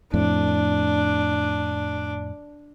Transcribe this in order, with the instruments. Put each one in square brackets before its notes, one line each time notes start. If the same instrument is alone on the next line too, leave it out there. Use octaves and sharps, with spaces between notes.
[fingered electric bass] F2 A2 [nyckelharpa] D4